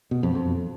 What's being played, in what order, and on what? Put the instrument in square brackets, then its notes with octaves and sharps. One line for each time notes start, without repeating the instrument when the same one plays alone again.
[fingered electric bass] B2
F2
F2